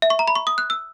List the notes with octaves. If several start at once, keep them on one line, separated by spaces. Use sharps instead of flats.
E5
C#6
A#5
B5
C#6
D#6
F#6
E6